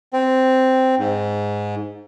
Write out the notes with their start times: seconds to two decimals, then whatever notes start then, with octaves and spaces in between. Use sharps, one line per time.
0.13 C4
0.99 G#2